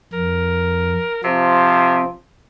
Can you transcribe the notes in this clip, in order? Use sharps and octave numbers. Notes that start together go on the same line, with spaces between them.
F2 A#4
C3 F3 C4